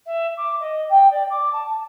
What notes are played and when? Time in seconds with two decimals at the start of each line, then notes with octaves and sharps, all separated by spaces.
0.06 E5
0.37 D6
0.60 D#5
0.89 G5
1.10 D5
1.30 D6
1.52 A5